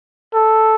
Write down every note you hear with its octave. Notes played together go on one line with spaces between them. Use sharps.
A4